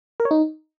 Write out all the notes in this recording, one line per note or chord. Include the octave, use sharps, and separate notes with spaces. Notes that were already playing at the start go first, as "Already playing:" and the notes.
A#4
C#5
D#4